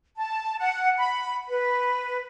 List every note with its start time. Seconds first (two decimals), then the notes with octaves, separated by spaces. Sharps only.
0.16 A5
0.59 F#5
0.98 B5
1.49 B4